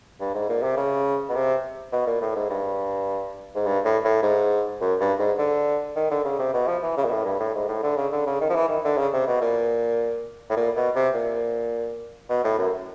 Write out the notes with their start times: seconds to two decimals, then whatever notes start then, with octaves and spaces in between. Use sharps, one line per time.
0.20 G2
0.34 G#2
0.49 A#2
0.62 C3
0.77 C#3
1.29 B2
1.35 C3
1.92 B2
2.06 A#2
2.21 A2
2.36 G#2
2.50 G2
3.55 G#2
3.66 G2
3.85 A2
4.04 A2
4.22 G#2
4.81 F#2
5.00 G2
5.19 G#2
5.38 D3
5.96 D#3
6.11 D3
6.25 C#3
6.39 C3
6.54 B2
6.67 F3
6.83 E3
6.97 C#3
7.05 A#2
7.11 A2
7.25 G2
7.40 A2
7.54 G#2
7.68 A2
7.83 D3
7.97 C#3
8.12 D3
8.27 C#3
8.41 D#3
8.49 F3
8.55 E3
8.69 D#3
8.84 D3
8.98 C#3
9.13 C3
9.27 B2
9.41 A#2
10.50 A2
10.56 A#2
10.76 B2
10.95 C3
11.14 A#2
12.30 B2
12.45 A2
12.59 F#2